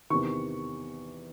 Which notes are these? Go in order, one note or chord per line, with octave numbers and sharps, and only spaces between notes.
E2 C3 D#3 C#6